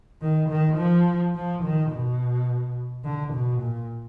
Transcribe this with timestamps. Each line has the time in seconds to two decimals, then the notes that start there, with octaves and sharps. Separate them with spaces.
0.22 D#3
0.49 D#3
0.77 F3
1.35 F3
1.63 D#3
1.91 B2
3.04 D3
3.33 B2
3.61 A#2